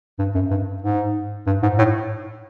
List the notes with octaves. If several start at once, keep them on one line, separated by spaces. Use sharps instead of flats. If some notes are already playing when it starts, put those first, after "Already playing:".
G2
F#2
G2
G#2
G2
G#2
A2